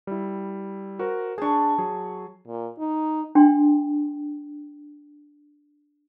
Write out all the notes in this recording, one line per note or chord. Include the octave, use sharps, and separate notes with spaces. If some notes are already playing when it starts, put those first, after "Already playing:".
G3 E4
F#4 A#4 C5
D4 G#4 A5 C#6
F#3 G#4
A#2
D#4
D4 G5 C6